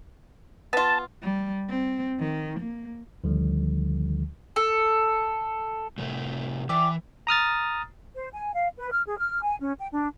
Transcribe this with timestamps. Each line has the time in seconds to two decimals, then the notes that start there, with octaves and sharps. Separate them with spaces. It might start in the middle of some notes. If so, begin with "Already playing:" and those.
0.73 B3 F4 A5
1.23 G3
1.69 C4
2.19 D#3
2.59 A#3
3.24 D2 D3 D#3 F3 G3
4.56 A4
5.98 A2 C3 A3
6.69 E3 G4 D5 E5
7.27 A#5 D#6 F6 A6
8.15 C5
8.33 G#5
8.53 F5
8.78 B4
8.91 F6
9.06 G#4
9.19 F6
9.42 G#5
9.60 C#4
9.79 G5
9.92 D4